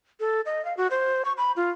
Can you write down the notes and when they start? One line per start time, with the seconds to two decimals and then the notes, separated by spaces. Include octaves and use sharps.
0.20 A4
0.46 D#5
0.65 F5
0.77 F#4
0.91 C5
1.25 C#6
1.37 B5
1.56 F4